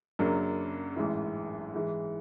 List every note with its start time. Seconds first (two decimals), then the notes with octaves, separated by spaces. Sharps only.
0.19 F#2 C#3 F#3 A#3 D4
0.96 A1 G#2 E3
1.74 G#2 E3 G#3